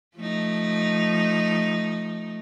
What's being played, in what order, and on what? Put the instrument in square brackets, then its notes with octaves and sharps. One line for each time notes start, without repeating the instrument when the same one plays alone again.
[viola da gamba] F3 A3 D#4